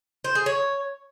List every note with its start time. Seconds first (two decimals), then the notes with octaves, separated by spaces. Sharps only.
0.24 C5
0.35 G#4
0.46 C#5